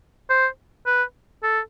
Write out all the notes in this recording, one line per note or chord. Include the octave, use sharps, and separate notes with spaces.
C5
B4
A4